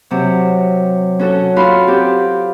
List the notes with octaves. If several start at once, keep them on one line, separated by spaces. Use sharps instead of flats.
C3 F#3
C#4 F#4 A4
F4 F#4 F5 B5 C6
C4 G4